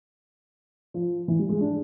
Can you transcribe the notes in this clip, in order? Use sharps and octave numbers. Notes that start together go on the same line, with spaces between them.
F3
E3
G3
G#3
D4